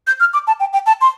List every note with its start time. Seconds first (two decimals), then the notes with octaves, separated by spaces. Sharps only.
0.07 G6
0.20 F6
0.33 D6
0.47 A5
0.60 G5
0.73 G5
0.86 A5
1.01 C6